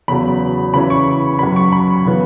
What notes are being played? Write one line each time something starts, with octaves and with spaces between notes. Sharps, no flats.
E2 C#3 F#3 B5
C#3 E3 C#4 E4 B5
C#6
F#2 F#3 C#4 B5
C#6
B5
C#3 E3 B3